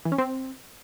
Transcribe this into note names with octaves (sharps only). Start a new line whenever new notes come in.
E3
C#4
C4